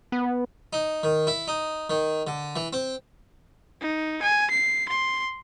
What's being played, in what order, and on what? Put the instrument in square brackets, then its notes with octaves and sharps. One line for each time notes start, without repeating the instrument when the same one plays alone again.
[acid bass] B3
[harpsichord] D#4
D#3
E4
D#4
D#3
D3
E3
C4
[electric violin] D#4
G#5
C7
C6